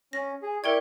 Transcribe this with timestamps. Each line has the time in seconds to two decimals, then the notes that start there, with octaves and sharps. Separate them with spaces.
0.13 C#4 A#6
0.42 G#4
0.64 E4 A#4 D5 G5 C#6 G#6